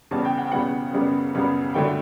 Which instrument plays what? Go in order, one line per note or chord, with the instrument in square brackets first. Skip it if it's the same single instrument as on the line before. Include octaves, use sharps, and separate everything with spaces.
[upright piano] E2 C#3 G3 B3 A5
G5
F#5
G5
E2 C#3 G3 B3 F#5
F#2 C#3 G3 B3
F#2 C#3 G3 B3
G2 D3 F#3 A3 G5